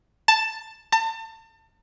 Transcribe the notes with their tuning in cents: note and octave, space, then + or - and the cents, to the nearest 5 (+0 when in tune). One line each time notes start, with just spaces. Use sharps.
A5 +10
A5 +35